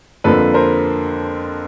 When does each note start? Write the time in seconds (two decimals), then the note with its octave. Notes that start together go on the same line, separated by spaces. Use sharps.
0.24 F2 D3 F3 A#3 A4 B4
0.54 A#4 C5